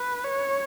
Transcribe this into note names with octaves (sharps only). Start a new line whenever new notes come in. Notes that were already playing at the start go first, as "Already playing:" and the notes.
Already playing: B4
C#5